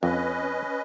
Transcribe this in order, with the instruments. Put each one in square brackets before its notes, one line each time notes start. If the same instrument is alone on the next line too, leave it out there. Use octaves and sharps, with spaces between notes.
[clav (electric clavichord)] F2 [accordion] C#4 B4 D#5